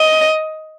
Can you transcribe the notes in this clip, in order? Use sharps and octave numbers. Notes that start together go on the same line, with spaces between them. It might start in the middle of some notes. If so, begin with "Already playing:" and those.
Already playing: D#5